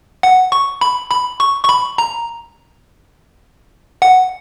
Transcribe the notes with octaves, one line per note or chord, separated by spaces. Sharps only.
F#5
C#6
B5
B5
C#6
C#6
B5
A#5
F#5